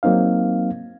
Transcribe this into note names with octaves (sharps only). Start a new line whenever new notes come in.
F#3 A#3 C4 D#4 F5